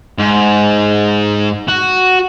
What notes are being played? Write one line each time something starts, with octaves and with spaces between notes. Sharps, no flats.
G#2
F#4